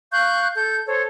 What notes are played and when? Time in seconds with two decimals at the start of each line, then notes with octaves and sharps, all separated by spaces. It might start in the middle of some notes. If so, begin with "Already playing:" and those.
0.12 F5 C#6 F#6 G6
0.54 A4 G6
0.86 A4 C5 C#5